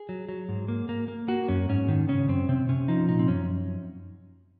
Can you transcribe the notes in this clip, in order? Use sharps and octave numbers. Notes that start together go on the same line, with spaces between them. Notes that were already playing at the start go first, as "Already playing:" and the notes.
Already playing: G#4
F#3
F#3
G#2
A#3
A#3
A#3
A#3 F#4
F#2 C#4
G#2 C#4
D#3
C#3 C#4
F#2 C4
C3 C4
C3 C#4
F3 D#4
A#2 D#4
C4
F#2 C#4